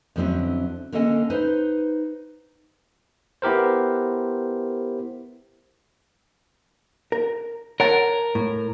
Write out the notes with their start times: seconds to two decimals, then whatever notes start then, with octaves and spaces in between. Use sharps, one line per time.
0.16 F2 D3 F#3 C4 C#4 E4
0.92 D3 A#3 C#4 A4 D#5 G#5
1.30 D#4 B4 C5
3.42 B3 E4 G4 A#4 C5
7.12 A#4
7.80 A#4 C#5 F#5 A5
8.35 A2